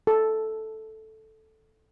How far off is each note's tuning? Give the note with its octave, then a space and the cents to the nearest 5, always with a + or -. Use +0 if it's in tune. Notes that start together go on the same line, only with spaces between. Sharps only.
A4 -5